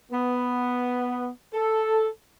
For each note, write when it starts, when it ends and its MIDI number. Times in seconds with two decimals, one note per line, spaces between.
0.12 1.29 59
1.53 2.08 69